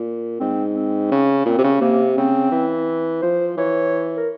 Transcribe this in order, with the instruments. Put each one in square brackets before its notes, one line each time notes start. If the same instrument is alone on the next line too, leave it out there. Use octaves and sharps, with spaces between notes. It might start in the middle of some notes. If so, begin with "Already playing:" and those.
Already playing: [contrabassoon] A#2
[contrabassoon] G#2 [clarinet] C4
[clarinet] C4
[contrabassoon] C#3
[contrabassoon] A#2 [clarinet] C4
[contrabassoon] C3
C#3
[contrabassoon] C3 [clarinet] A#3
[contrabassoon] C#3 [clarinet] C4
[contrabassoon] E3
[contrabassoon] F3 [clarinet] C5
[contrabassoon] E3 [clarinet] C#5
[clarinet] A#4